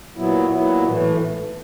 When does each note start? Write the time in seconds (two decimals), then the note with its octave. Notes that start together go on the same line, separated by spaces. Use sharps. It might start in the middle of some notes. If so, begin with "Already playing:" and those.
0.16 A#2 F#3 B3 E4
0.50 A#2 F#3 B3 E4
0.84 A2 E3 A3